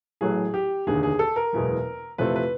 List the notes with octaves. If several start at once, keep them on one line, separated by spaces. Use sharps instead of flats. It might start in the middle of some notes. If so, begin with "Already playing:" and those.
A1 A2 F#3 A3 G#4
G4
F1 D#2 D3 G#4
G#4
A4
A#4
F#1 E2 B2 G#3
F2 C3 E3 A3 C4 B4
B4